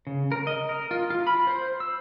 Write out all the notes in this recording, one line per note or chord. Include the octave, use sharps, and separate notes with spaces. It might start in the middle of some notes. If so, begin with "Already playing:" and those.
C#3
A#4
D#5
A#4
F4
F4
B5
C5
E6